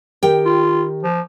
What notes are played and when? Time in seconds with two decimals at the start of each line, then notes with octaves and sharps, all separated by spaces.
0.23 D#3 G4 G5
0.46 F4
1.03 F3